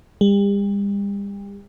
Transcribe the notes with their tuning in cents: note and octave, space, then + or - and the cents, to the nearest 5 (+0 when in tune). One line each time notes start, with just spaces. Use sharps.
G3 +40